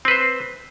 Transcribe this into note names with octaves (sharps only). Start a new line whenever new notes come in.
C4 B4 C5